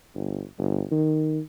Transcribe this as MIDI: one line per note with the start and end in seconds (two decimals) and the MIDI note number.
0.14 0.43 31
0.58 0.83 31
0.91 1.40 51